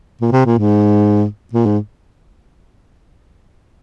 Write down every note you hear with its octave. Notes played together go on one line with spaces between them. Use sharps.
A#2
C3
A#2
G#2
A#2
G#2